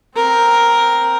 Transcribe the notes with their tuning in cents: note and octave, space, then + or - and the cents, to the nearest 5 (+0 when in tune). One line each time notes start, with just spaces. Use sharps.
C4 +0 A#4 +5